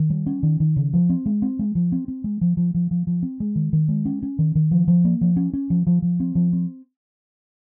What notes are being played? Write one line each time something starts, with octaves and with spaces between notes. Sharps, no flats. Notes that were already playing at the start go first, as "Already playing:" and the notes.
Already playing: D#3
G3
C#4
D#3
D#3
C#3
F3
C4
G#3
C4
G#3
F3
C4
C4
G#3
F3
F3
F3
F3
F3
C4
G#3
D#3
D#3
G#3
C#4
C#4
D#3
D#3
F3
F3
A#3
F3
C#4
C#4
F3
F3
F3
C4
F3
C4